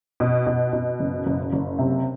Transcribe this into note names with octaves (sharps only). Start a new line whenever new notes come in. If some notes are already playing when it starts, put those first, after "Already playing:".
B2
B2
B2
F#1
F#1
F#1
C3